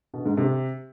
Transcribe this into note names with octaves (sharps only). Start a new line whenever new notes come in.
B2
G#2
C3